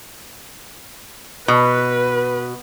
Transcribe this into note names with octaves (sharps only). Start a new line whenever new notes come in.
B2 B4